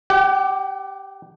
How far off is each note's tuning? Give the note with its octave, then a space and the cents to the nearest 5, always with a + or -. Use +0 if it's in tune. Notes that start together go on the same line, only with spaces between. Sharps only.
G4 +0 F#5 +45